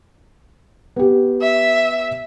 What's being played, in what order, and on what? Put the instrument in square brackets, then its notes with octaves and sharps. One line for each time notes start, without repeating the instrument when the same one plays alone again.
[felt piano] B3 G4
[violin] E5